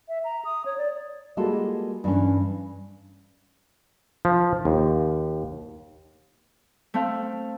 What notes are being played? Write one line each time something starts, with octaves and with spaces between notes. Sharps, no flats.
E5
A#5
D#6
C#5
D5
G3 G#3 A#3 F4 F#4 A4
G2 E3 C#4
F3
D#2
A3 C4 A4 F5